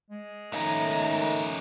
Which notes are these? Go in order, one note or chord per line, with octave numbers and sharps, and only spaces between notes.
G#3
D#3 A3 C#4 D#4 A#5